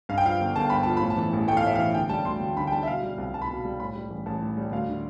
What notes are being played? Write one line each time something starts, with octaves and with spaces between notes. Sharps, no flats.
G2 F5
G5
F3 F5
G1
G1 A5
G2 B5
F3 A5
A2 B5
A5
E3
A1
A3 G5
F5
A2 E5
E3 F5
D3 G5
G3 A5
D2 C6
D2
D3 B5
G5
G3 A5
E5
B2 F5
G3
C2
C2 A5
B5
B2 A5
G3
A2 B5
G3
A1
A1 A5
A2
G3
D2 F5
D3